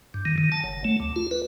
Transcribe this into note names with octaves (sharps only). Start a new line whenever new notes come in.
G2
D#3
D#3
A5
F#1
A3
D2
F4
B4